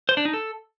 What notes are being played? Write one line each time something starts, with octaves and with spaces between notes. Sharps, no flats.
C5
D4
D#4
A4